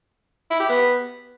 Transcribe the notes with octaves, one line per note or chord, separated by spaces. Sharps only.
E4
G4
B3